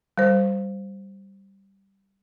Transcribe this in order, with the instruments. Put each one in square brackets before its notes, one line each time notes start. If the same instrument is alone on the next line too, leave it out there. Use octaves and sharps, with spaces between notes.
[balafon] G3 C5